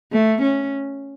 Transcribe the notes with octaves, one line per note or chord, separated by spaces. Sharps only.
A3
C#4